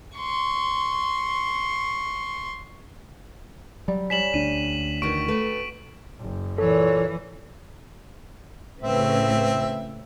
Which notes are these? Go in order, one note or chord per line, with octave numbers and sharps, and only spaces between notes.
C6 C#6
F#3 G3
G3 C#4 B6 E7 F#7
D2 D4 D#7
D#3 E3 E4 F#4 G5 C#6 D7
A3 B4
F#1
A#2 E3 A4 C#5
A2 C#3 C4 B4 E5